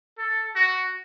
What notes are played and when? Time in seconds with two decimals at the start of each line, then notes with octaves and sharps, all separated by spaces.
0.18 A4
0.55 F#4